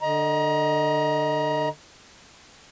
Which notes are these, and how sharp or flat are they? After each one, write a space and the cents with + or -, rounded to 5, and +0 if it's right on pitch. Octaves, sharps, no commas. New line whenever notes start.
D3 +20 D#5 +0 A#5 +30